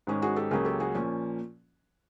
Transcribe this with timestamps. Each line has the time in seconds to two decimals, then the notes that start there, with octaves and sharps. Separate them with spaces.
0.07 G#2 D#3 G#3 C#4
0.22 F#4 G#4
0.36 G4 A4
0.51 C#2 C#3 F#3 A#3 C#4 G#4 A#4
0.65 G4 A4
0.80 F#4 G#4
0.95 A#2 F3 A#3 C#4